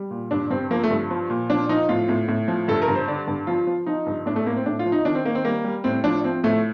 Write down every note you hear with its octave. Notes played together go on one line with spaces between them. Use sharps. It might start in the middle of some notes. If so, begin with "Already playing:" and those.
Already playing: G3
A#2
G2 D4
G2 C4
F3 A#3
A3
G2
F3
A#2
F3 D4
F3 D#4
A2 F4
A2
A2
F3
G2 A4
A#4
G2
C5
D3 D5
G2
F3 F4
F3
F3 D#4
G2
A2 D4
A3
A2 A#3
C4
A2 D4
F4
F3
D#4
D#3 D4
C4
D#3 A#3
C4
G3 A#3
G3
A2 C4
F3 D4
F3 C4
A2 A3